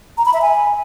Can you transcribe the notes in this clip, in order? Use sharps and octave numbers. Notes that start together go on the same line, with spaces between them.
A#5
B5
E5
G#5